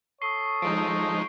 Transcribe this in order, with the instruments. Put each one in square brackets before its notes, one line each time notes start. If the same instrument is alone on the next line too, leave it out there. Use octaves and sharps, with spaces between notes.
[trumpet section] A4 C#5 D#6 [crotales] C#6 C7 G7
[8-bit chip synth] F3 G#3 D#4 [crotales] D7